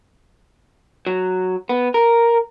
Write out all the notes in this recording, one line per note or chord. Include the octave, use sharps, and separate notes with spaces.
F#3
B3
A#4